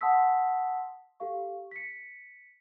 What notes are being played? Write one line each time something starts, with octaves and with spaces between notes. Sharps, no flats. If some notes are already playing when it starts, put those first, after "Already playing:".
F#5 A5 C6 D#6 E6 B6
G4 A4 F5 C#6
B6 C#7